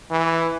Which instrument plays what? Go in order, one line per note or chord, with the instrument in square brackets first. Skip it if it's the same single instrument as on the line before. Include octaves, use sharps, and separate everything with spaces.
[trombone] E3